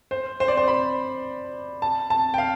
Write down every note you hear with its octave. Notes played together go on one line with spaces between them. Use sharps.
C5
C5
D5
C5
B5
A5
A5
G5
F5